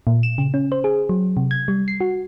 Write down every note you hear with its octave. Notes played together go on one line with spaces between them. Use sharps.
A#2
E7
C#3
C#4
C5
G#4
F#3
C3
G#6
G3
C7
F#4